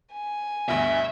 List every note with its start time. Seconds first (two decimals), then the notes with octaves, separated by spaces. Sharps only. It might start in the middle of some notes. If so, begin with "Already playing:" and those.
0.13 G#5
0.69 D2 G2 B2 E5